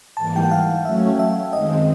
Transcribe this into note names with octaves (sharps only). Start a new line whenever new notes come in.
G#2 E3 G3 A#3 A5
G5
F#5
F5
F#3 A3 C#4 E5
E5
F#2 D#3 G#3 C4 D#5